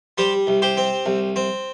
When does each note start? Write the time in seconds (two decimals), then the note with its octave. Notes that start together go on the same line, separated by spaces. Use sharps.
0.18 G3 G4 C5
0.47 C2
0.62 G4 C5
0.77 C4
1.06 C2
1.36 C4